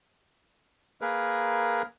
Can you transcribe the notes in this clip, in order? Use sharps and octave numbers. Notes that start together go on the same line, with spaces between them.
A#3 G#4 A#4 B4